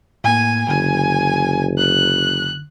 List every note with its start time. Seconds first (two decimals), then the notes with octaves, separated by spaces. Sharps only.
0.24 A2 A#3 G#5
0.68 F#1 D3 G#5
1.78 F#6